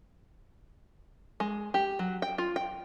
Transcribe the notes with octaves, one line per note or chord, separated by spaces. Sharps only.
G#3
G4
F#3
G5
F4
G5